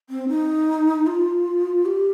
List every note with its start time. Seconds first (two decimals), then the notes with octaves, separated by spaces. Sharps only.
0.10 C4
0.29 D#4
1.07 F4
1.86 G4